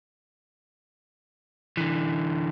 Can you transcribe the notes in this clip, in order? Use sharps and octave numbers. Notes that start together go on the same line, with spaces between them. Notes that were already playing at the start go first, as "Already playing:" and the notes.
D3 E3